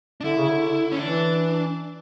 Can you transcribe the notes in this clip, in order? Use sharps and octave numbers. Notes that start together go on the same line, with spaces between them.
D4
D3 E4
C#3
D3
C#4
E3 D4